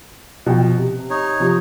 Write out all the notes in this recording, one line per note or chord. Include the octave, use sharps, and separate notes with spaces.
B2 F3 G5
C3
D#4 C#5
C3 F3